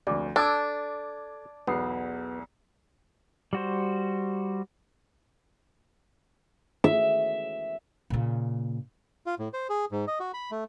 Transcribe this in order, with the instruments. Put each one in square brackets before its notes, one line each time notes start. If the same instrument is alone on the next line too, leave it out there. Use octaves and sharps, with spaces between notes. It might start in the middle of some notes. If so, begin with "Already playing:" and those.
[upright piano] F1 D2 [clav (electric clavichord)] D5
[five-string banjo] D4 [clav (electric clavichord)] A4 [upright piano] D6 G#6 A6
[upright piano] B1 E2 C7 [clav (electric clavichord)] B3
[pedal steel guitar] G3 F#4 C5
[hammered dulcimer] E5
[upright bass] A#2 C#3
[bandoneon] F4
A2
C5
G#4
G#2
D#5
F#4
B5
A3